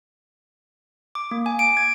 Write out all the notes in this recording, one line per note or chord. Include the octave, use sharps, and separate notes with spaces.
D6
A#3
G#5
D7
G#6